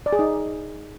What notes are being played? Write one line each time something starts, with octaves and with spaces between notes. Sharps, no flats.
D5
G#4
D#4